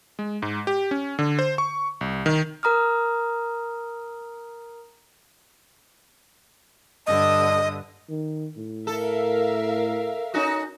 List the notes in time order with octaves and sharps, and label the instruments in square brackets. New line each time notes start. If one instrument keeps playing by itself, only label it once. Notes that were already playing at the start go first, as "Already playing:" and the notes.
[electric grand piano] G#3
G#2
G4
C#4
D3
C5
C#6
C2
D#3
[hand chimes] A#4 A#5 D#6 F6
[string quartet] G2 D3 D#6 [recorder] D#5
[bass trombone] D#3
A2
[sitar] A4 [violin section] A#4 E5 F5
[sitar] C#4 D#4 F#4